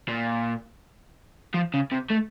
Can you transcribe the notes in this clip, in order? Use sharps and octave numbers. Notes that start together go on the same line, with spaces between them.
A#2
F3
C#3
C3
A3